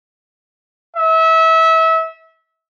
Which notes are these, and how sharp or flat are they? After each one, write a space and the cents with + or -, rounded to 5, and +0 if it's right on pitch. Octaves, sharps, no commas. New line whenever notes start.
E5 -25